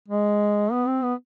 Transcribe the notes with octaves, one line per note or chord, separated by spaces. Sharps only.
G#3
B3
C4
B3